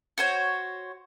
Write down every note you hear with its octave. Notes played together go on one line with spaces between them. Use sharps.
F#4 C5 C#5